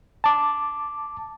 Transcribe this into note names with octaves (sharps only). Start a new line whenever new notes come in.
A5 D6